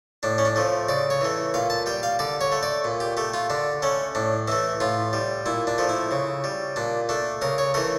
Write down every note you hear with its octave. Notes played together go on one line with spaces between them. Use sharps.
A2 D4
C#4
D4
F3 A3
C#3 D5
C#5
E3 A3
A#2 F5
A5
G3 G5
F5
D3 D5
C#5
A3
D5
A#2
G4
A3 G4
F4
D3 D4
A3 C#4
A2 D4
E3 A3 E4
A2 F4
G3
A#2 E4
D4
F3 A3
E4
C#3
G3
A#2 D4
A3 D4
C#3 A#4
C#5
E3 A3 A#4